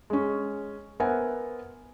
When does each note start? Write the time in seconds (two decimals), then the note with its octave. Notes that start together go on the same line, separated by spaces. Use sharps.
0.10 G#3 C#4
1.00 B3 A#4 C5 E5 F#5 G#5